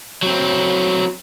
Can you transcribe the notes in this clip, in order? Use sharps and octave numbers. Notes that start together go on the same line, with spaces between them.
F#3 C4